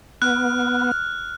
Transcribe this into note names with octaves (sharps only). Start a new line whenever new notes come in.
B3 F6 F#6